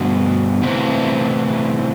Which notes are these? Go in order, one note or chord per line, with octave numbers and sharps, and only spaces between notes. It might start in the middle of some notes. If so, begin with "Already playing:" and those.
Already playing: G2 B2 D3 B3
A2 C3 E3 C4